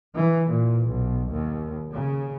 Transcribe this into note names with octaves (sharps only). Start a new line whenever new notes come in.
E3
A#2
B1
D#2
C#3